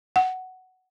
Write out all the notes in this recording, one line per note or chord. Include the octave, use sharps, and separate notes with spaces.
F#5